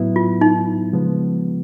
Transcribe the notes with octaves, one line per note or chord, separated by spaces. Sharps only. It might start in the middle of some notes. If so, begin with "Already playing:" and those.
Already playing: A2 F#3 B3 E4
F4
D#4
C#3 F3 G#3 B3